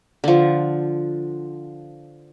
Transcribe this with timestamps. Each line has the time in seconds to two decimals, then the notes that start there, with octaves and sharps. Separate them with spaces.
0.24 D3 F3